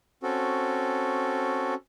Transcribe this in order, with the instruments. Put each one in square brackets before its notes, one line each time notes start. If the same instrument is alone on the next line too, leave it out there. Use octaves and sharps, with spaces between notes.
[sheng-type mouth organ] C4 C#4 F#4 A4